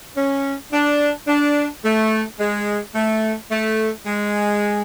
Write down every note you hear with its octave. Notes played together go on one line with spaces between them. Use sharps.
C#4
D4
D4
A3
G#3
A3
A3
G#3